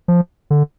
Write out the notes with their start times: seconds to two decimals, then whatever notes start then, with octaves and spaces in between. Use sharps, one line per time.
0.08 F3
0.50 D3